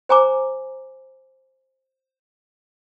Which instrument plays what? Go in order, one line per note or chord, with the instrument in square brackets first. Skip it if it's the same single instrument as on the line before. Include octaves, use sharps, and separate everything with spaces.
[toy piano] C5 G#5 A#5 D6